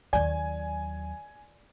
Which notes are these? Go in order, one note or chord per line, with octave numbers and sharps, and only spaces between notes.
D#2 F#3 D5 G#5